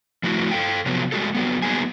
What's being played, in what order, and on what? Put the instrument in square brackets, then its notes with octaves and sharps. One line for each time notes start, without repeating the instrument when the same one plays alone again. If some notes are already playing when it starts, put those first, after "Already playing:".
[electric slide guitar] F3 A3 E4 F#4
A4 F5 G5
C3 F3 F#3 B3
G3 G#3 F#4 A4
F#3 G3 B3
F#3 A#3 B3 D#4 G#4 G#5